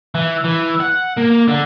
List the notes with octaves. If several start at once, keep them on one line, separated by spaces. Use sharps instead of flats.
E3
E3
F#5
A#3
D3